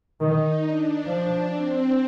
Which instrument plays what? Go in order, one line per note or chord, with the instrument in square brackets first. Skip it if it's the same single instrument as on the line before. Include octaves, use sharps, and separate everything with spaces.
[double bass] D#3 [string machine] D#4
[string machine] D4
[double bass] F3
[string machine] C4